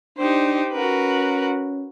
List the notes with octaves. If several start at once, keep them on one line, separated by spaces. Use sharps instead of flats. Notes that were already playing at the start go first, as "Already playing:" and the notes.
D4 D#4 G4 C5
C#4 F#4 A#4 B4